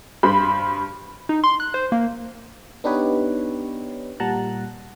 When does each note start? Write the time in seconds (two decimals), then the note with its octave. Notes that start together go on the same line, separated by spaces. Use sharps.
0.23 G2 C5 B5
1.29 D#4
1.44 C6
1.60 F#6
1.74 C5
1.92 A#3
2.84 B3 D4 D#4 G4 B4 C#5
4.20 A#2 G3 F#5 A5 A#5 F#6